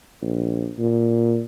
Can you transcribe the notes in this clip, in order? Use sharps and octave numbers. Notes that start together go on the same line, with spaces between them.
A#1
A#2